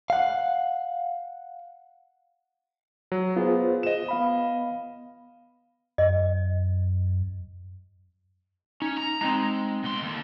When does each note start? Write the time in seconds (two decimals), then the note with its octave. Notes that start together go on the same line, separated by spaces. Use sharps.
0.10 F5 F#5
3.12 F#3
3.36 B3 F4 G#4 C5
3.83 D#5 E7
4.09 B3 F5 B5
5.98 F#2 D#5
8.82 C#4 D#4
8.98 A#5
9.21 G#3 C4 D#4 A#5
9.84 B2 C6
10.02 D#2 D3